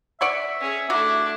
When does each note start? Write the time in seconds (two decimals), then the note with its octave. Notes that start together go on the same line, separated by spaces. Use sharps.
0.21 D5 E5 F#5 C#6
0.60 C#4 G#4
0.90 A3 D4 E4 F#4 D6